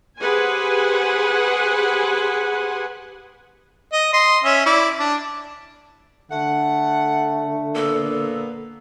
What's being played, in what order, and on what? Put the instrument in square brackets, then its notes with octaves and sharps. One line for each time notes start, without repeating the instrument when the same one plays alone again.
[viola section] G4 G#4 B4 C5 F#5 G#5
[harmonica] D#5
D#5 C6
C#4 E5
E4 D5
D4
[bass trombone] D3 [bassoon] A3 [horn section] F#5
[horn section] A#2 A#3 B3 [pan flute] A4